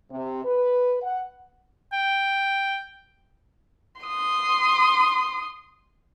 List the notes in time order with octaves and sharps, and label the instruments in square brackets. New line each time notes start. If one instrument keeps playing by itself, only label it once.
[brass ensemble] C3
B4
F#5
[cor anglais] G5
[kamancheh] C6 D#6